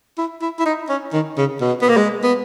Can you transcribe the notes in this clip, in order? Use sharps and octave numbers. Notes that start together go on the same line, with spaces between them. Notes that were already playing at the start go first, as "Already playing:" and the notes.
E4
E4
E4
D#4
C#4
D#3
C#3
B2
B3
A#3
G#3
B3